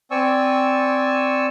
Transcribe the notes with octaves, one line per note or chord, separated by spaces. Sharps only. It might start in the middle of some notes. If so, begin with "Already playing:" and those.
C4 D5 G#5 C#6 E6